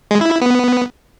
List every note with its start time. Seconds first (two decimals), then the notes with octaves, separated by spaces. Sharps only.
0.11 G#3
0.21 E4
0.31 E4
0.41 B3